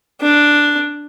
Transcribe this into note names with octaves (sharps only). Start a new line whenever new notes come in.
D4